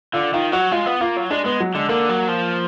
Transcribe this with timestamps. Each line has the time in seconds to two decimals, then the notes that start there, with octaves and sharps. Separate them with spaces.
0.13 D3 F4
0.34 D#3 F4
0.52 F#3 F#4
0.72 G#3 F4
0.86 B3
1.01 A#3 F4
1.17 F#3
1.30 G#3 D4
1.45 G#3 B3
1.60 F#3
1.74 D3 G#3
1.89 D3 A#3
2.09 F#3
2.28 F3